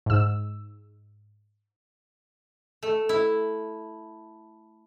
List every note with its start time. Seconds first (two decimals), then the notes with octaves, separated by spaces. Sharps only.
0.06 G#2 E6
2.83 A3
3.09 E4